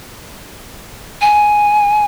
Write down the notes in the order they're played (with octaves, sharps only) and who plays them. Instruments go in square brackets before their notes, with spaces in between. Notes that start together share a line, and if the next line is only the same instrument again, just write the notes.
[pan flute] G#5